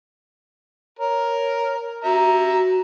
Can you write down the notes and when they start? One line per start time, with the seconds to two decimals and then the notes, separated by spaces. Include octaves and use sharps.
0.99 A#4 C#5
2.04 F#4 E5 A#5